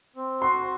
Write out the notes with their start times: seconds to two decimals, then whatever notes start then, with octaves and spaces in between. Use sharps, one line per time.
0.16 C4
0.41 F#4 C6